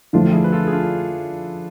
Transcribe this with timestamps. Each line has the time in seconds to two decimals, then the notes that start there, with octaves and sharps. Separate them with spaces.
0.13 D3 F3 A3 D4 F4
0.33 E4 G#4
0.44 B4
0.52 F4 A4
0.67 G#4
0.73 D4 F4